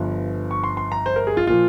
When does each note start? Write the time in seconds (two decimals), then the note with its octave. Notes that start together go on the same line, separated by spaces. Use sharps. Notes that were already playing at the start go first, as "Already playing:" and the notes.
Already playing: G1 G2 F3
0.51 C#6
0.64 C6
0.77 C6
0.92 A#5
1.06 C5
1.16 A#4
1.27 G#4
1.37 F4
1.47 A#2 F3 F4